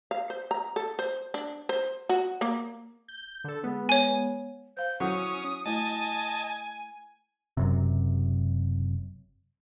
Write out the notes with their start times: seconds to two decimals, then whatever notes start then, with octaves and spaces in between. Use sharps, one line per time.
0.11 F5
0.30 C5
0.51 A#5
0.76 A4
0.99 C5
1.34 D4
1.69 C5
2.09 F#4
2.41 A#3
3.08 G6
3.44 D3 A4
3.63 G#3 B3
3.89 C#5 G#5
4.77 C5 F5 G6
5.00 F#3 C#4 E4 D#6
5.66 A3 E4 D#5 G#5 A5
7.57 F#1 F#2 C3